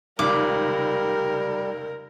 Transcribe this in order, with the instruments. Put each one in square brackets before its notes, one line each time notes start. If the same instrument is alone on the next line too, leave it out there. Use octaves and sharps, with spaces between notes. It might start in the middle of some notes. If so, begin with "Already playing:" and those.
[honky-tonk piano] F1 C#2 D#3 [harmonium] G3 [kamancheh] A#4 [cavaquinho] D6